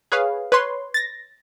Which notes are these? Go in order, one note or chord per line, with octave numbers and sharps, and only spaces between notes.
G#4 B4 C#5 F5
B4 C#5 C6
A6 A#6